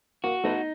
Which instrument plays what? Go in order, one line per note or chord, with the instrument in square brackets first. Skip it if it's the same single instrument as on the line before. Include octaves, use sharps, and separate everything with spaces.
[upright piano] A#3 [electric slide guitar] F#4
[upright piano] A3 B3 [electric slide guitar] D#4